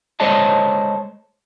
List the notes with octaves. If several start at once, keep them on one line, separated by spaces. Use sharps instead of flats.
G#3 A4 C5 C#5 D#5 A5